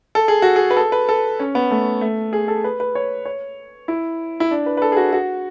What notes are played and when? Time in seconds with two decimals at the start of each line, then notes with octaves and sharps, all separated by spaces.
0.15 A4
0.28 G#4
0.42 F#4
0.56 G#4
0.71 B4
0.77 A4
0.92 B4
1.09 A4
1.40 C#4
1.55 B3
1.71 A3
2.01 A3
2.33 G#4
2.48 A4
2.64 B4
2.80 B4
2.95 C#5
3.25 C#5
3.88 E4
4.40 E4
4.51 D4
4.66 B4
4.77 B4
4.82 A4
4.92 G#4
4.97 F#4
5.13 F#4